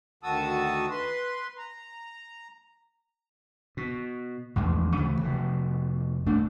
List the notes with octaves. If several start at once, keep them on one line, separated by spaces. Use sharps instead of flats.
D2 D#3 F#4 A5 D#6 E6
B4 C6
A#5
B2
A1 E2 F3 G#3
D2 C#3 E3 A3
F1 B2
D#1 A3 D4